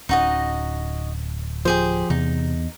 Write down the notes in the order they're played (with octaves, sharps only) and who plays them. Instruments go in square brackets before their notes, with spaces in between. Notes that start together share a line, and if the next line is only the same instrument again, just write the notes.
[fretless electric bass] D1 C#4 [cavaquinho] D#4 F#4 D#5
[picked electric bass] F3 [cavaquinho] G4 G#4 C5
[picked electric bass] E2 [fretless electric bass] C3 [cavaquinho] D#4